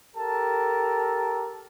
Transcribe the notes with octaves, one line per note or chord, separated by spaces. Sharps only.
G4 A4 A#4 A5